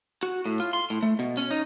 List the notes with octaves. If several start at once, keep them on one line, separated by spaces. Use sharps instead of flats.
F#4
A2
F4
C6
A2
A3
B2
C#4
D#4